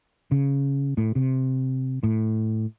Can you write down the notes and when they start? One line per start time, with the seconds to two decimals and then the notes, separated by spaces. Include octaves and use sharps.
0.31 C#3
0.98 A2
1.15 C3
2.03 A2